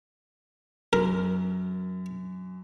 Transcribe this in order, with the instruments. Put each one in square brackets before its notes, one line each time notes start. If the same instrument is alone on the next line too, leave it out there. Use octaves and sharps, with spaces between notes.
[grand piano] F#2 [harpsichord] A#4